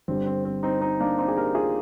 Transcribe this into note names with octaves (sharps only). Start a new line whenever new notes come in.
G1 G2 D3 G3 C4
C4
C4
C4 D#4
C4 D#4
A#3 D4
C4 D#4
G#4
G4 A#4
F4 G#4